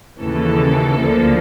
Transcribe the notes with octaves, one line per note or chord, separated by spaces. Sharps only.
D#2 C#3 E3 A4
D2 D3 F3 A#3